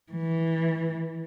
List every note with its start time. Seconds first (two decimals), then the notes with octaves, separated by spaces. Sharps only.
0.12 E3